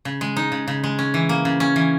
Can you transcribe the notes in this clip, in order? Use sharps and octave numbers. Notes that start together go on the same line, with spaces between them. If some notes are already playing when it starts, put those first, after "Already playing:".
C#3
G#3
D#4
C#3
C#3
G#3
C#4
E3
A#3
C#3
C#4
E3